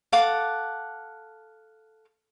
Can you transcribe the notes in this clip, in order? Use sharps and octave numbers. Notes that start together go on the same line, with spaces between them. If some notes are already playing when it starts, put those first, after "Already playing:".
A4 F5 F#5 D6